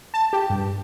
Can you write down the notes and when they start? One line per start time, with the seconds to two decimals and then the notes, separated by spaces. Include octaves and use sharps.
0.14 A5
0.33 G4
0.50 G2